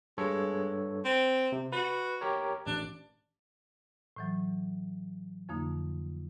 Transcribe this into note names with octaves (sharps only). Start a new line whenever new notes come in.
G2 G#3 A4 C#5
C4
C3
F#4 B4
G4 A#4 C#5
A1 D4
A2 E3 F#3
F2 D3 F3 A#3 D#4